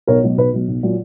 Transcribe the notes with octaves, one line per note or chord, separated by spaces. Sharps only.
B1 A#4 C#5
B2 F#3
B1 B4
B2 F#3
B1
A#2 F#3